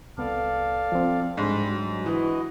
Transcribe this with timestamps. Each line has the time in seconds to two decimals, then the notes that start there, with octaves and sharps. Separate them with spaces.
0.18 C2 B3 A4 D5 F5
0.92 F3 C4
1.37 G#2 G3 D4 B5 C6
1.68 F#3
2.06 E3 F#4 B4 D#5